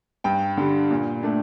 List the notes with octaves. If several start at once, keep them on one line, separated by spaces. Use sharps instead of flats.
G2 G5
D3 G3
A#2
A3 D4